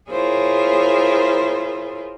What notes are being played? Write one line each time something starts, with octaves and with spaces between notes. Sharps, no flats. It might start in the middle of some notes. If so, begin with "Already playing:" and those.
E4 F4 G#4 A#4 C5 C#5